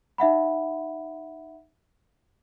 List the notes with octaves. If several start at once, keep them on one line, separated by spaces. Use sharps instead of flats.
D#4 E5 F#5 B5